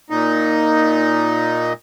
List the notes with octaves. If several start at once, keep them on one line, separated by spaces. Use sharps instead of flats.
A#2 D#4